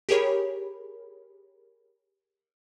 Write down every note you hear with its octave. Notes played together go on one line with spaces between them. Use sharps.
G4 G#4 A#4 C#5 B5